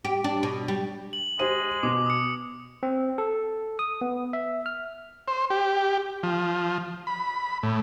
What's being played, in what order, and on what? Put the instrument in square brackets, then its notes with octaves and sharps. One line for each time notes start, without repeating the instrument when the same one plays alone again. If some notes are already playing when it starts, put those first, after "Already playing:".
[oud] G4
D4
B2
G3
[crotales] F#7
[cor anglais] G#3 [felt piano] G4 C5 D#7
[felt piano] B2 [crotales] D6
[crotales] D#6 C#7
[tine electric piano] C4
A4
D#6
B3
E5
F6
[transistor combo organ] C5
G4
F3
B5
A2